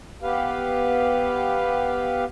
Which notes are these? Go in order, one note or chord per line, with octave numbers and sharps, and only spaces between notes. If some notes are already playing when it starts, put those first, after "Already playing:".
B3 G4 B4 F5